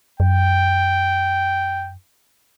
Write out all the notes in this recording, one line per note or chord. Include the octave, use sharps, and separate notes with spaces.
F#2 G5